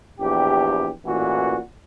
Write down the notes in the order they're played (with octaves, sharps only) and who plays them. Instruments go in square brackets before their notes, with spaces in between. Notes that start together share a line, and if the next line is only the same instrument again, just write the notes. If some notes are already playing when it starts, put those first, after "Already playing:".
[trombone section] A#1 E2 G4
A1 A#2 E3 F#4